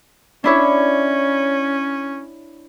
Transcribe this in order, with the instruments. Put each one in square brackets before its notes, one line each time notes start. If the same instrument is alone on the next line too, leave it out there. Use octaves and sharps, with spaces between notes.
[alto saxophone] C#4 [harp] D4 E4 C#5